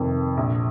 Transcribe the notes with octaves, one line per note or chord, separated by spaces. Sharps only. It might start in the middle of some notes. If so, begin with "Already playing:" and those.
Already playing: F1 F2 D#3
A#1